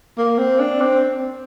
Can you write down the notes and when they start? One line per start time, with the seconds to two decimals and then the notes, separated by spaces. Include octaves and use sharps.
0.18 A#3
0.38 C4
0.60 D4
0.81 C4